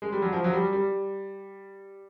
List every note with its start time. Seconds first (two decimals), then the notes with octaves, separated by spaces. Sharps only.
0.02 G#3
0.12 G3
0.22 F#3
0.33 F3
0.44 F#3
0.53 G3
0.73 G3